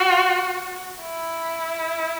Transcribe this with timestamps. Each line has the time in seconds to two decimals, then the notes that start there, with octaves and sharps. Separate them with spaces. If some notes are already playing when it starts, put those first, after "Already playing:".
Already playing: F#4
1.02 E4